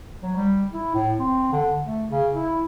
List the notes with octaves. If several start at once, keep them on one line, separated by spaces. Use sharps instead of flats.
F#3
G3
E4
A2
C4
D3
A3
C#3
E4